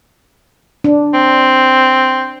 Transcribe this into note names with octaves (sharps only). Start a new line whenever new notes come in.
D4
C4